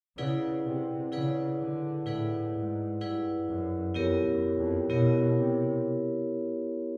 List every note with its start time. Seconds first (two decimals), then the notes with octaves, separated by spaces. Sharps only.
0.18 C#3 E4 G#4 B4 D5 F#5
0.65 C3
1.12 C#3 E4 G#4 B4 D5 F#5
1.60 D3
2.06 A2 E4 G#4 B4 D5 F#5
2.54 G#2
3.01 G2 E4 G#4 B4 D5 F#5
3.48 F#2
3.95 F2 B3 E4 G4 A#4 C#5
4.26 F#2
4.58 F2
4.89 B2 B3 E4 G4 A#4 C#5
5.36 C3